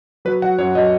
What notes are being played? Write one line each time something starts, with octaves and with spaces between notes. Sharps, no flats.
F#3 B4
F#3 F#5
F#2 C#5
F#3 D#5